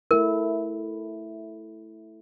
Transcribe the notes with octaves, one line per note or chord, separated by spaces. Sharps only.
A3 E4 A#4